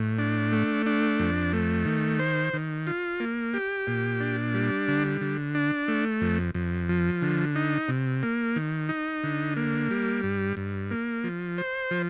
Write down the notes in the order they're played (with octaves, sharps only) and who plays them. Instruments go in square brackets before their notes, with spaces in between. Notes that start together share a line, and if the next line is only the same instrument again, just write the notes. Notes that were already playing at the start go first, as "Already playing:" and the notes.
Already playing: [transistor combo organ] A2
D4
A3
D4
F2
A3
D#3
C5
D#3
F4
A#3
G4
A#2
D4
G3
D3
D3
D4
A3
F2
F2
F3
D3
D#4
C3
A#3
D#3
D#4
D3
A#3
G3
G2
G2
A#3
F3
C5
F3